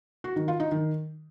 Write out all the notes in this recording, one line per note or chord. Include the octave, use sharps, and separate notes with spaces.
F#4
D#3
F4
D#4
D#3